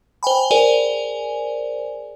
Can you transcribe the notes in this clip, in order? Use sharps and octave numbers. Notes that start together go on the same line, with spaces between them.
C5 G5 G#5 B5
G#4 A#4 C5 D5 G#5